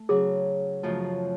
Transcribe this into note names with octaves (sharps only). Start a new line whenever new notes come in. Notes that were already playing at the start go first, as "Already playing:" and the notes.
Already playing: A3
C#3 F#3 C#4 G#4
F#2 C#3 F3 A3 F4